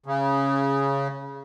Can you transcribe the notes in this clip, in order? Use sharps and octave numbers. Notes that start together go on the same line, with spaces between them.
C#3